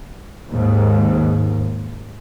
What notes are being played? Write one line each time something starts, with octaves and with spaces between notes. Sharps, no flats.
D#2 G#2